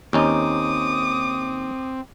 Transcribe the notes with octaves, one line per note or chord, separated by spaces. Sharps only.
D#2 C4 C#4 D#4 D6 D#6